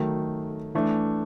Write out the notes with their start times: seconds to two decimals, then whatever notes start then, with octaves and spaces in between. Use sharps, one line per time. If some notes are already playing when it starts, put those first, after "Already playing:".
Already playing: D#3 F#3 A3
0.75 E3 A3 D4